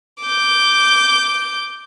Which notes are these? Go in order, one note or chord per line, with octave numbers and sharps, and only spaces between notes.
D6 G6